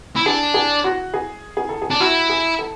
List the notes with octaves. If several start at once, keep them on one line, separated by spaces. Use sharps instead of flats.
E4
D4 G#4
G#4
F#4
G#4
G#4
A4
G#4
D4
E4 F#4
G#4
A4